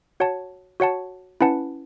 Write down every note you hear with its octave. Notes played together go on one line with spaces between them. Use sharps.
F#4 C#5 F#5 A5
F#4 C#5 F#5 A5
C#4 E4 B4 F#5 A5